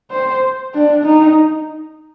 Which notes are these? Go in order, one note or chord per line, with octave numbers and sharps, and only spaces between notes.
C5
D4
D#4